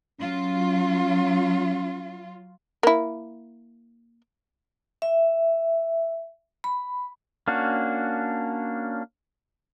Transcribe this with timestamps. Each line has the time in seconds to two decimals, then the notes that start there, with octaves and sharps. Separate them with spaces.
0.19 F#3 C#4 F4
2.83 A#3 E4
5.02 E5
6.64 B5
7.48 A#3 C#4 D4 F#4